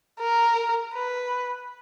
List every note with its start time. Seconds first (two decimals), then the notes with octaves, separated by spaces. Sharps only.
0.20 A#4
0.93 B4